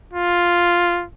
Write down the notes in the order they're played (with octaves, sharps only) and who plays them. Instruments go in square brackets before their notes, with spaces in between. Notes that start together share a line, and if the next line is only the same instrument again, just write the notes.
[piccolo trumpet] F4